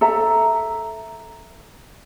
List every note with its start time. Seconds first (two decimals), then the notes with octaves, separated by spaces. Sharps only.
0.01 A4 E5 A#5